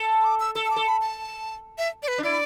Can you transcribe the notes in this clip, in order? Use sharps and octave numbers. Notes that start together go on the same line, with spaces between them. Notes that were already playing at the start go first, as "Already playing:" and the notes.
Already playing: A4
B5
D6
E6
A4 E6
E6
D6
A4
B5
A5
E5
D5
B4
D4
E4 D5